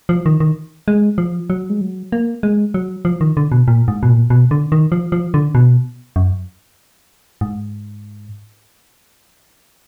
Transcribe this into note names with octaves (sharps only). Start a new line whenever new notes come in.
F3
D#3
D#3
G#3
F3
F#3
G#3
F#3
A#3
G#3
F#3
F3
D#3
D3
B2
A#2
G#2
B2
A#2
B2
D3
D#3
F3
F3
D3
B2
F#2
G#2